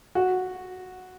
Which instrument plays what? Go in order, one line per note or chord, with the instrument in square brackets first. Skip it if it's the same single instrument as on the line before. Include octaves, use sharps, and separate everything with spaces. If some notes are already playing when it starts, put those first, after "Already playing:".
[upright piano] F#4